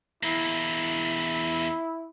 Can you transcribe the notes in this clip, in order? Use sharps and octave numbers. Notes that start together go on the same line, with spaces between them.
E2 A#3 E4